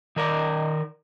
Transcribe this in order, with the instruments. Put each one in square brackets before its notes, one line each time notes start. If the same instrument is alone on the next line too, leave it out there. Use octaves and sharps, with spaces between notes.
[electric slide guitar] D#3 A#4 D5